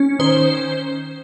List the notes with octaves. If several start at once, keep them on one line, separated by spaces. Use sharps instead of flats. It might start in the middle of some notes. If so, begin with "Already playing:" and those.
Already playing: C#4
D#3 C5